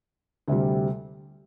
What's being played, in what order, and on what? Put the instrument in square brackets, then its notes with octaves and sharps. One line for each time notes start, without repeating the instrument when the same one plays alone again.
[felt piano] D2 C3 G3